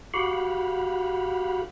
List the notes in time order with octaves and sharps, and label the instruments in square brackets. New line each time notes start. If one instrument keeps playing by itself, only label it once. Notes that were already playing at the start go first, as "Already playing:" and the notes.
[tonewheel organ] F#4 G4 F5 F#5 B5